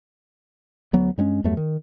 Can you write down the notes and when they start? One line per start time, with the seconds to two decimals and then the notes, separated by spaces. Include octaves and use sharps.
0.93 D2 F#3 B3
1.18 G2 G3 G#3 C#4
1.44 E2 G2 F#3 A3
1.57 D#3